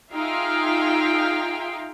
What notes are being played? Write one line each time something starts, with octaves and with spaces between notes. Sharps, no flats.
D#4 F4 G#4 E5 F5 G5